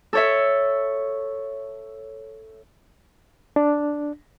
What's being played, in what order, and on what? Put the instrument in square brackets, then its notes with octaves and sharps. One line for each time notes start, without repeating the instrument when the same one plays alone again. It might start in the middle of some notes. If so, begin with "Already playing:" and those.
[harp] A4 C#5 E5
[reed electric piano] D4